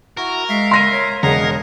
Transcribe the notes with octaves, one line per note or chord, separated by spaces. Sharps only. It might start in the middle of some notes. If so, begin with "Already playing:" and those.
E4 F#4 A#4
G#3 E5 F5
C6 A#6 D#7
C#5
E1 A#4 C#5 D#5 F5 F#5